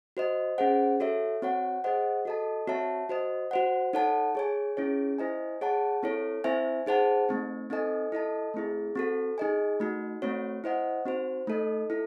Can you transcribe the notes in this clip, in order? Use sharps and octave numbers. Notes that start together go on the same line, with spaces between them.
F#4 C5 D#5
C#4 G#4 C5 F#5
F#4 A4 C#5 E5
C4 F#4 C#5 F#5
G#4 C5 D#5 F#5
F#4 A4 D#5 A5
C4 F#4 C#5 E5 A5
F#4 C5 D#5
F#4 C5 F#5
D#4 A4 C#5 F#5 A5
G#4 C#5 G#5
C#4 E4 G#4 C#5
E4 C5 D#5 G#5
G#4 C#5 F#5 A5
C4 E4 A4 C#5
C4 E4 C5 E5 G#5
D#4 G#4 C5 F#5 A5
A3 C4 D#4
C4 D#4 A4 D#5 G#5
E4 A4 D#5 A5
A3 C4 E4 G#4
C4 F#4 A4
D#4 G#4 D#5 G#5
A3 D#4 F#4
A3 C4 F#4 C#5
E4 C5 D#5 F#5
C4 D#4 F#4 C5
A3 D#4 A4 D#5
E4 A4